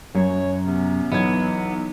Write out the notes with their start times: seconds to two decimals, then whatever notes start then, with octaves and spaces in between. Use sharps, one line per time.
0.15 F#2 F#3 C#5
0.65 C3 B3 C#4
1.12 B1 E3 F#3 B3 G#6